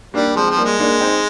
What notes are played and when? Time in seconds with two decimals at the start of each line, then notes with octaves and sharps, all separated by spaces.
0.14 G3 A#3 D4
0.35 F3 G#3 C4
0.48 F3 C4
0.57 G3 A#3
0.64 G#3
0.79 A#3 D4
1.01 C4 D#4